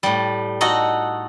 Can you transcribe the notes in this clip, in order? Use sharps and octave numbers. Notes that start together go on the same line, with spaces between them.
A2 G3
D#4 F#4 A4 D#5 F#5